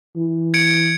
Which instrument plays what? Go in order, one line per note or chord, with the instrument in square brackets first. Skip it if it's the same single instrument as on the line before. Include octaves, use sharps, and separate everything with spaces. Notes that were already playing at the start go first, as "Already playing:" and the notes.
[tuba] E3
[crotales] G#6 C#7 D7